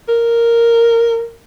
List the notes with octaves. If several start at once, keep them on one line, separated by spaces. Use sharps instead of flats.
A#4